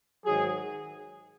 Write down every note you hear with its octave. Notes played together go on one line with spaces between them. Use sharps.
G#2 D#3 F#3 G#4